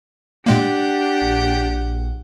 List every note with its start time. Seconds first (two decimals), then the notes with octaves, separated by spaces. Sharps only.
0.46 A#2 G#3 A#3 D4 G4 F#5 G5
1.22 A#1